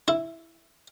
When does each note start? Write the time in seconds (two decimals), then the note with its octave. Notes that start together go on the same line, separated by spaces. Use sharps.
0.08 E4